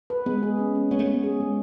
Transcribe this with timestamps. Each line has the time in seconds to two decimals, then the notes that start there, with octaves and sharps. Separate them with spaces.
0.10 B4
0.26 G#3 B3
0.43 G#4
0.59 C#4
0.75 C#4
0.91 B3 C#5
0.99 A3
1.06 B3 C#5
1.24 G#4
1.40 G#3